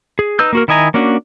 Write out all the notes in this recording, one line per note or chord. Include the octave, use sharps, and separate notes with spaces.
G#4
D#4 B4 E6 G6
A#3 F#4 A#4
D#3 E4 D#5 G#5 A#5
A#3 C#4 D4 F#4